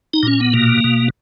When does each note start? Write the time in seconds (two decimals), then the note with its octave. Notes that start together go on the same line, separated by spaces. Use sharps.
0.14 D#4
0.23 A#2 C#4
0.40 B3
0.53 B2 A#3
0.84 B2